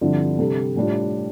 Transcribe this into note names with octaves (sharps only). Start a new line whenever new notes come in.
G2 D3 F3 C4 E4
C3 G3 D4 A4
A2 G3 D4 F4